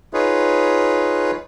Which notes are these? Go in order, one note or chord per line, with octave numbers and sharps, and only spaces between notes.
D#4 F4 G#4 B4 C#5